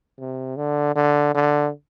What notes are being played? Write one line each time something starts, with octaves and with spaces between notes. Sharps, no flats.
C3
D3
D3
D3